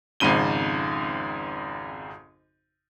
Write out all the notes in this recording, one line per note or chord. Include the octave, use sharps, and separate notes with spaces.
G#1 F2 G#2 C#3 D#7 G7